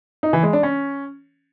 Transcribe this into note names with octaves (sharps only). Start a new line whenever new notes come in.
D#4
E3
G#3
D4
C#4